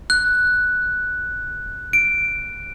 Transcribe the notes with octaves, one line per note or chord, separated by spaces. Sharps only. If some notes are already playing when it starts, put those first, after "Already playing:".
F#6
D7